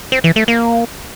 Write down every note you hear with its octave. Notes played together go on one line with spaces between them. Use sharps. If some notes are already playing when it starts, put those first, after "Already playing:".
C4
E3
A3
A#3